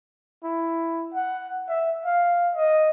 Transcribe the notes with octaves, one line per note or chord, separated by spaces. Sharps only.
E4
F#5
E5
F5
D#5